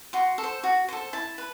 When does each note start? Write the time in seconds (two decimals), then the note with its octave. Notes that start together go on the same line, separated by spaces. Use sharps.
0.13 F#4 C6
0.38 A4
0.43 C5
0.63 F#4
0.89 A4 C5
1.13 E4 A5
1.38 B4